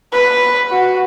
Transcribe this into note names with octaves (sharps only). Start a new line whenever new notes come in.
B4
F#4